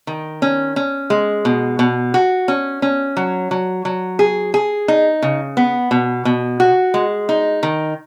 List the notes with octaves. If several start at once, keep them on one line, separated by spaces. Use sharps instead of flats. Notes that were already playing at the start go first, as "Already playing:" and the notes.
D#3
C#4
C#4
G#3
B2
B2
F#4
C#4
C#4
F#3
F#3
F#3
G#4
G#4
D#4
C#3
B3
B2
B2
F#4
G#3
D#4
D#3